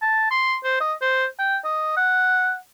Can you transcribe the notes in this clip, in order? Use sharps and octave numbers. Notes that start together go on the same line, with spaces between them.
A5
C6
C5
D#5
C5
G5
D#5
F#5